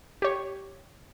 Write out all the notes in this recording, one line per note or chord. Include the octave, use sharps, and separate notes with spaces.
G4 C#5